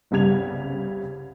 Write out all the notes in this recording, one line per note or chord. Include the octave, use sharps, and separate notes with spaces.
G1 C2 C#3 G3 G#6 F7